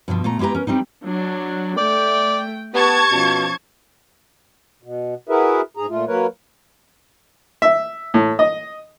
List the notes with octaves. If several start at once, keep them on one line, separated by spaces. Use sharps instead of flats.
G2 B2 E3 F3
A#2 A3 A#5
G#3 E4 G4 B4 A#5
C#4 A#4
G3 C4 D4 D#4
F#3 D4
A3 D5 G5
B3 G4 B4 A5 C#6 G#6
B2 F3 C#4
B2
E4 F#4 G#4 A#4 B4 E5
G#2 G#4 A#5
A#2 A3 F4
F#3 A#3 A#4 B4 C#5
E5
A2
D#5